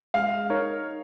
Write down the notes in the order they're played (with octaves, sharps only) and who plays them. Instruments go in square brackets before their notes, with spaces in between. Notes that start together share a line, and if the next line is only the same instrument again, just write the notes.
[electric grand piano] G#3 [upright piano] F5
[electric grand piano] D#4 A#4 C#5